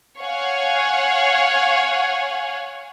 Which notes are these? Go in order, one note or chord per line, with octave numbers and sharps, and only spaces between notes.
C#5 F5 F#5 G#5